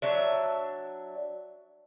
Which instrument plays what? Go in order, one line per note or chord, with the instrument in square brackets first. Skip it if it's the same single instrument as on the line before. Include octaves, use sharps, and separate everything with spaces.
[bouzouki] F#3 D4 E5